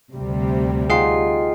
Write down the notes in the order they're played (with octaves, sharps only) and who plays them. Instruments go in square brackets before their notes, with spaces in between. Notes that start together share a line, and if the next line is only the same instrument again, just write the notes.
[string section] D2 C3 G3
[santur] D#4 F4 G4 [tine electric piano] G#4 F#5 C7